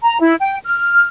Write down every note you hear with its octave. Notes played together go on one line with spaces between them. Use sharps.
A#5
E4
G5
F6